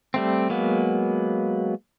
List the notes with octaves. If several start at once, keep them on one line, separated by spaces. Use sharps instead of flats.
G3 A3 C4
F#3 G#3 A#3 B3